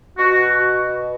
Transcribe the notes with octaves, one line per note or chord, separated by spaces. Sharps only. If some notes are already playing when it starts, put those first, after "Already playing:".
B2 F#4